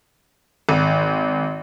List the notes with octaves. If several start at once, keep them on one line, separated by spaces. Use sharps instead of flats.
G#1